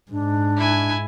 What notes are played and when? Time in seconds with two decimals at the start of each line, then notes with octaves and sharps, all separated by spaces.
0.11 G#2 D4
0.57 E4 G#5